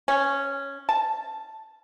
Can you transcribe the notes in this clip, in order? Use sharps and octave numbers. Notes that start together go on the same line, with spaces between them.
C#4
A5